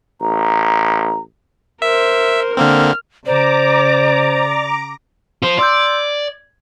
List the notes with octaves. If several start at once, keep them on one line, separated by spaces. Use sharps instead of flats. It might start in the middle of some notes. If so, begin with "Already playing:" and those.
A1 A#5
A#4 C5 E5
D3 A#3 C4 F6
C#3 C5 D5 A#5 D6
F4 C5
D5 C6 E6 G6
G#6